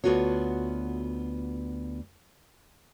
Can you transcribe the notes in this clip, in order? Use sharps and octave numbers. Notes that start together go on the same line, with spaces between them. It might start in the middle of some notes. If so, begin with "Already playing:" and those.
D2 B3 F4 F#4 C#5